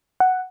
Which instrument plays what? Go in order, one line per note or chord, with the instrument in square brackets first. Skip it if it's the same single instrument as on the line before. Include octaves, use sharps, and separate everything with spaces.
[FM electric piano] F#5